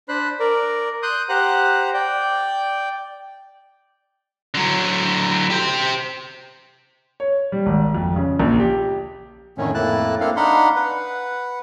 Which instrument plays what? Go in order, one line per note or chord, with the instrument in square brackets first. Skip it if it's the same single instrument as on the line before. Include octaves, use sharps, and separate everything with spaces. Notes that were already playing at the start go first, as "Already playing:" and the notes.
[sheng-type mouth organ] D4 C5 B5 F#6
A#4 D5
C6 D#6 F#6 G6
G4 C5 F#5 A#5 F#6
D5 G5
[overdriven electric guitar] D3 F#3
G4 C5
[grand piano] C#5
G3
G#1
F2
C#3
A#1
G4
[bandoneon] F2 A2 D3 D#3 A3 C#4
F2 A2 A#3 E4 A5 F#6
A#3 C4 D4 E4 A4 F5
D4 D#4 F5 F#5 B5 C6
B4 F#5